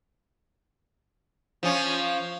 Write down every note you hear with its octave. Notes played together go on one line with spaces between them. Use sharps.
F3 C#4